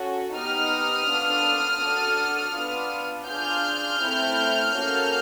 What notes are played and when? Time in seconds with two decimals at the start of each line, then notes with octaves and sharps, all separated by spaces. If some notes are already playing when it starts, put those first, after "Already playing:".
Already playing: C#4 F#4 A4
0.37 B3 D#4 G4 D#6 F6
1.09 B3 D4 F4 A4
1.82 D4 F#4 A4
2.55 B3 D4 F4
3.27 D4 F4 G#4 F6 G6
4.01 A3 C4 E4
4.74 A#3 C#4 F#4 A4